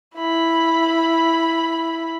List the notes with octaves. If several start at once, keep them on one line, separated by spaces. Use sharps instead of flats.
E4 B5